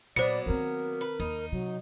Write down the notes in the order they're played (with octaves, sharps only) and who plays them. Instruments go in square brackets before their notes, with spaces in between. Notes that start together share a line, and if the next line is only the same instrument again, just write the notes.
[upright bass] A#2 [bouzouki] F#3 A#3 B3 [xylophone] C5 C#7 [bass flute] D5
[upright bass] D#3 C4 [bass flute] A#4
[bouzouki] B4
[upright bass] D#2 [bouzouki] D#4
[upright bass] C3 [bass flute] F#3